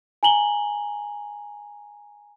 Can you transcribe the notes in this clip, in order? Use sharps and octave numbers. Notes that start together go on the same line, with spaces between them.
G#5 A#5 F#7 G7